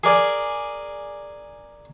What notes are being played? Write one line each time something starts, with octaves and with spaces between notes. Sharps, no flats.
G#4 A#4 D5 G#5